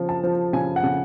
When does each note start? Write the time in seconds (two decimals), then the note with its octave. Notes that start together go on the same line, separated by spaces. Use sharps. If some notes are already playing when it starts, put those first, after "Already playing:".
Already playing: C#3 F3
0.09 A5
0.24 F3
0.53 C#3 G#5
0.76 F#5
0.83 C#3